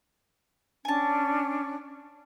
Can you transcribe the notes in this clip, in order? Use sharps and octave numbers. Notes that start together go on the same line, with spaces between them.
C#4 D4 G#5 A5